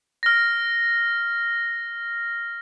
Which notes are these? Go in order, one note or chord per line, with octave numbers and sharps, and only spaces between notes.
F6 A#6